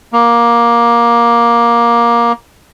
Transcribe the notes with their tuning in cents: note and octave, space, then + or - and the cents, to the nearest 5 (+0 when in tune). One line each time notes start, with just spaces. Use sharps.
A#3 +15